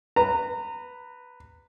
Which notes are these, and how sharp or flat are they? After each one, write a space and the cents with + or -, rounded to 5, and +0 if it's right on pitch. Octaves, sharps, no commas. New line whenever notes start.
B4 +0 A#5 -25